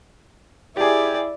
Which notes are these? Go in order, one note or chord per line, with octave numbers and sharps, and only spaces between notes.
E4 G4 G#4 D5